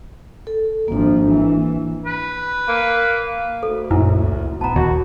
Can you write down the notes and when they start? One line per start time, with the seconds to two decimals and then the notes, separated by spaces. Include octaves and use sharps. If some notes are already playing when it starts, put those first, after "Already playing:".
0.47 A4
0.88 G#1 F3 A#3 D4
1.30 E3
2.05 B4
2.68 A#3
3.63 D2 A4
3.91 A#1 F#2 A#2 E4
4.18 C#2
4.61 D#1 A#1 B3 A5 A#5
4.76 D#2 F#4